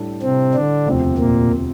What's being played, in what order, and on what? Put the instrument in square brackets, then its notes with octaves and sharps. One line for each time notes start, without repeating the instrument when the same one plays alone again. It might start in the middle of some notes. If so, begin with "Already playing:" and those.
Already playing: [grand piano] A2 G3 D4 A4
[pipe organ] C3 C4
D3 D4
[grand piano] E1 D2 C3 F3 C4
[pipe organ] A#2 A#3